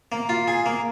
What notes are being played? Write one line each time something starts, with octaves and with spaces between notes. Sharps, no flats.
A#3
F4
G#4
A#3